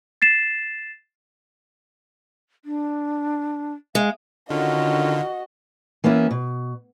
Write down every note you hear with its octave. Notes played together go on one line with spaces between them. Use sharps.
A6 C7 E7
D4
G#3 F5
D3 D#3 C#4 F4 F#4 D#5
E3 A#3 B3 C#4 E4
B2